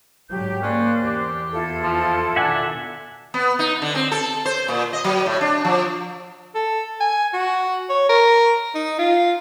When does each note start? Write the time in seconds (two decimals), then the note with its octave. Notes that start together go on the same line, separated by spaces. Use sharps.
0.30 G#2 D3 F#3 G4 G6
0.62 A#3 C#4 C5 D5 F#6
1.03 E2 G4
1.52 E4 F4 A4
1.83 F3
2.36 B2 D#3 D4 E5 F#5 G#5
3.34 B3
3.59 D#4
3.82 D3
3.95 C4
4.12 A4
4.45 C5
4.68 A#2
4.93 D#5
5.04 F#3
5.26 A2
5.41 D4
5.65 F3
6.55 A4
7.01 G#5
7.34 F#4
7.90 C#5
8.09 A#4
8.75 D#4
8.99 F4